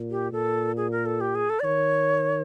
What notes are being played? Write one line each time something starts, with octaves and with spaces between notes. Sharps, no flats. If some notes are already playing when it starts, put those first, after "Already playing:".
Already playing: A#2
G4
A#2 A4
G#4
A#4
A4
G4
G#4
A4
D5
D#3 C#5